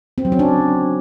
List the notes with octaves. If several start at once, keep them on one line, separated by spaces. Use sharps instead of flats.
C4
F#3
C#4
D4